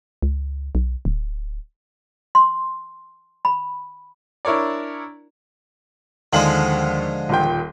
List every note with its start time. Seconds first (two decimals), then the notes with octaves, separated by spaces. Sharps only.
0.22 C#2
0.75 B1
1.05 D1
2.35 C6
3.45 B5
4.45 D4 E4 A#4 C#5 D5
6.33 D#2 D3 F3 G#3 F#7
7.29 D#1 A#2 G5